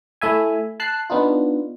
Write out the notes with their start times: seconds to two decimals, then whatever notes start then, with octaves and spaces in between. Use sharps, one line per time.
0.21 A3 E4 E5 G#5
0.80 A5 F#6 C7
1.10 B3 D4 D#4 F4